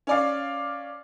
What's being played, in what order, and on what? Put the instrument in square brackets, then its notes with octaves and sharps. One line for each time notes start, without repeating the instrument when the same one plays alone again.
[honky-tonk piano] C#4 D5 F5